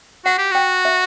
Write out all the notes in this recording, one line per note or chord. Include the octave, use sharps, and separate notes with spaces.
F#4 F#5
G4
F#4 G5
E5